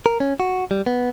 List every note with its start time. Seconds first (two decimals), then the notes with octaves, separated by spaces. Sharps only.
0.06 A#4
0.20 C#4
0.40 F#4
0.71 G3
0.86 B3